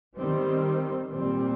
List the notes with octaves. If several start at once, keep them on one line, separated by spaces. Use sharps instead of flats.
D#3 G3 C4
A#2 G3 C4